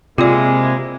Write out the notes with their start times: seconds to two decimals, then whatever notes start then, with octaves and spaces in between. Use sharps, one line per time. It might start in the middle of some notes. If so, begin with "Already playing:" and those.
0.18 C3 G#3 A#3 E4 F4 G#4 D5